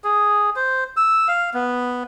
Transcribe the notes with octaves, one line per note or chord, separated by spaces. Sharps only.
G#4
C5
E6
F5
B3